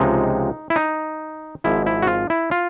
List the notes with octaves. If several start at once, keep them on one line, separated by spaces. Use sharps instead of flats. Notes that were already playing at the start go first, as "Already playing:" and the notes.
Already playing: C#2 C3 F3 G#3 D#4
E4
D#4
G#1 G#2 F3 E4
E4
F#4
F4
E4
F4